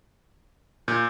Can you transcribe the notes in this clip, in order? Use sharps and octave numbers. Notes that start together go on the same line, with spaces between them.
A#2 G6